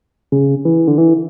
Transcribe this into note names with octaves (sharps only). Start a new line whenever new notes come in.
C#3
E3
D3
E3